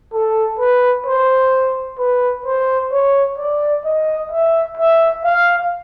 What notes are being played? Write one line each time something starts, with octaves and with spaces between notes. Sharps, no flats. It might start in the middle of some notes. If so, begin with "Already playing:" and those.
A4
B4
C5
B4
C5
C#5
D5
D#5
E5
E5
F5